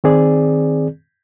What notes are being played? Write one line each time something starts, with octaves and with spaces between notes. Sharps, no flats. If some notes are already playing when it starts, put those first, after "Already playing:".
D#3 C4 G#4 D5